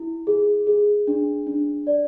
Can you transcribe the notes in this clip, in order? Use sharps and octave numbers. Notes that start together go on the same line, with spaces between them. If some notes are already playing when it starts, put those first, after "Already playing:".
Already playing: E4
G#4
G#4
D4
D4
D5